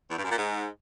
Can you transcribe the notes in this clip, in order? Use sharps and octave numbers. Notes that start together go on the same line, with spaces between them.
E2
G2
F#2
A#2
G#2